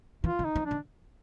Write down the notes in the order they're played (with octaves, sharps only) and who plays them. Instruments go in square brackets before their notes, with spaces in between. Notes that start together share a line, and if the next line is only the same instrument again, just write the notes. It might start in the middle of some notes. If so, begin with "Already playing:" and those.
[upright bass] E3 [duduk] F4
[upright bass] D#3
[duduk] D#4
[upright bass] F3
[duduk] D4
[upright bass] D#3